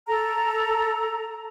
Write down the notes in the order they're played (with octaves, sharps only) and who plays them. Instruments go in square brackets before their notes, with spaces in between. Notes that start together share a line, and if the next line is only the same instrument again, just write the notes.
[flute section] A4 A#5